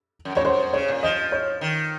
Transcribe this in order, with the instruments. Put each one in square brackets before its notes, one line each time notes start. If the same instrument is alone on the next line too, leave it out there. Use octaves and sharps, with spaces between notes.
[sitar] F#2
[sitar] F2 [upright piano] C#5
[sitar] F#2 [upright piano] C5
[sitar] C#3 [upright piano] C#5
[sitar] A#2
[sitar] F3 [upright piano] D#5
[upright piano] C#5
[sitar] D#3